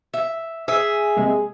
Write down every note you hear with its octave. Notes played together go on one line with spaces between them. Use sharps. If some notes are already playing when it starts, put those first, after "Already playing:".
E5
G#4 E5
C3 G#3 A#3